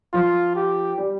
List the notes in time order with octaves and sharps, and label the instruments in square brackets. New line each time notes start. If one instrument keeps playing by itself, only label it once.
[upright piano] F3 [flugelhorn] F4
[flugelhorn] G4
[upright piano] G3